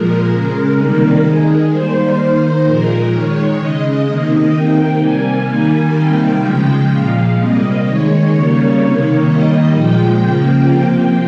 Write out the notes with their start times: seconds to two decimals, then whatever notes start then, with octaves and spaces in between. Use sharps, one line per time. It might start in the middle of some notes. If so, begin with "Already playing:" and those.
Already playing: A#2 F3 G#3 A#4
0.28 C#3 G#3
0.75 C3 D#3 G3 A#3 A#4
1.22 D#3 G#3 G#4
1.70 D#3 G3 A#3 C5
2.17 D#3 A#3
2.64 A#2 F3 G#3 A#4
3.11 D#3 G#3 C#5
3.59 C#3 G#3 D#5
4.06 C3 D#3 A#3 D#5
4.53 C3 D#3 A#3 G5
5.00 C3 G3 A#3 G#5
5.48 D#3 G3 A#3
5.95 C3 D#3 G3 A#3 G5
6.42 C#3 F3 G#3
6.89 A#2 F3 G#3 F5
7.36 C3 G3 A#3 D#5
7.83 D#3 G#3 C#5
8.30 C#3 G3 A#3
8.79 C3 D#3 A#3
9.25 D#3 G3 A#3 D#5
9.73 A#2 F3 G#3 G5
10.20 C#3 F3 A#3
10.67 C3 F3 A#3